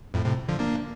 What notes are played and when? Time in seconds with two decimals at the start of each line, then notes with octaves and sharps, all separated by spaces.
0.14 F2 A2
0.25 A2 C3
0.48 D3 F3
0.59 A#3 D4